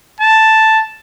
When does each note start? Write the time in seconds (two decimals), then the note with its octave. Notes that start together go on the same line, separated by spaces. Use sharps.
0.20 A5